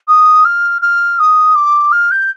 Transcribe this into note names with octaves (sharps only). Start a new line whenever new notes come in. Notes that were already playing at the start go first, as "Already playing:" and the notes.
D#6
F6
F6
D#6
D6
F6
G6